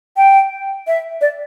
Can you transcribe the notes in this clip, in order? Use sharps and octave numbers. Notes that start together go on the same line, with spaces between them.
G5
E5
D5